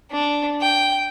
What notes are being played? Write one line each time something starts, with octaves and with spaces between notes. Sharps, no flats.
D4
G5